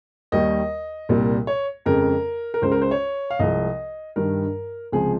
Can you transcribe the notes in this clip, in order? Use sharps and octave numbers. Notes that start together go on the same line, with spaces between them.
D#2 D#3 G3 D#5
C2 A#2 G3
C#5
F2 C#3 G#3 A#4
A#4
C#2 C#3 G#3 C5
A#4
C5
C#5
F5
C2 C3 F3 G#3 D#5
G2 D#3 G3 A#4
C#2 C3 F3 G#3 G#4